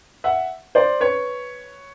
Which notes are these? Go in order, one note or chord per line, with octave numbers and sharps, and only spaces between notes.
E5 F#5
C5 D5
B4 C#5